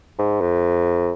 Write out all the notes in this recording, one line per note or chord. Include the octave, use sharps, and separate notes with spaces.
G#2
F2